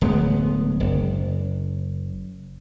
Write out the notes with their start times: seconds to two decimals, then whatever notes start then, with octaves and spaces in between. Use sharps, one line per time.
0.01 D1 G#3 A#3 B3
0.80 F#1